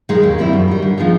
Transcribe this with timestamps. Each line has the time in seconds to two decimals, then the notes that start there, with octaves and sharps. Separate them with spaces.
0.09 D#3 G#3
0.23 D#2
0.38 D#3 G3 C4 E4
0.53 F#2
0.68 D#3 G3
0.82 D3
0.98 F3 G#3 B3 D#4